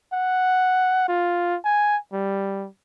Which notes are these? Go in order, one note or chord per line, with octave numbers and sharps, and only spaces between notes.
F#5
F4
G#5
G3